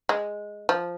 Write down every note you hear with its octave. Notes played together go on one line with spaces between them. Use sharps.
G#3
F3